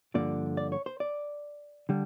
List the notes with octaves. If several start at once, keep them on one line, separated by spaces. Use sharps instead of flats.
G2 D3 F3 A#3 D5
D5
C#5
C5
D5
D3 G3